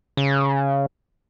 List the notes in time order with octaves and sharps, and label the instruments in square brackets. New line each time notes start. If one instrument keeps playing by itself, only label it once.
[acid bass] C#3